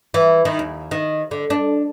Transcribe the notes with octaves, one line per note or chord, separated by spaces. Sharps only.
E3
D#3
D#2
D#3
D3
D4